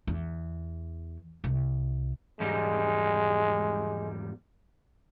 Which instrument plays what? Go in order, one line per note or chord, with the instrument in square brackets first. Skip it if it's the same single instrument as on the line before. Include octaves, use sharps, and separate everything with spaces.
[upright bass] E2
C2
[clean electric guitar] E2 G#2 G3 [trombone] G#3